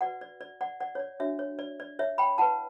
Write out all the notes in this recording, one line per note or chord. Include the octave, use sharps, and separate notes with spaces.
F#4 B4 D5 F#5
D5
D5
D5 F#5
D5 F#5
C#5
D5
D4 F#4 C#5 E5
C#5
D5
D5
C#5 E5
G5 B5
E4 B4 F#5 A5